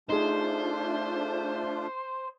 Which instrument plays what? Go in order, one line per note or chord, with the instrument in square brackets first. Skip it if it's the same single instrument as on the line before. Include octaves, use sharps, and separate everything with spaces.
[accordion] A3 D4 F4 [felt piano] D#4 G#4 [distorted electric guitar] C5